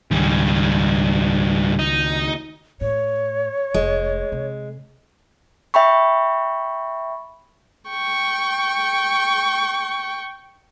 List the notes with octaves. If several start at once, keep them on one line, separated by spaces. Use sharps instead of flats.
C#2 G#2 D#3 G3
D#4
A2 C#5
F1 G#3
C3
E5 G5 B5 C#6
G5 C#6